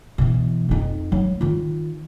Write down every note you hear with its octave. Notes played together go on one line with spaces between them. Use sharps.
B2 E3
F2 D#4
F#3
D#3 F4